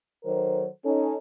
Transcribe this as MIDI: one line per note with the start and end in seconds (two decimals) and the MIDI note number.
0.24 0.66 51
0.24 0.66 54
0.24 0.66 69
0.24 0.66 70
0.24 0.66 72
0.85 1.16 61
0.85 1.16 63
0.85 1.16 69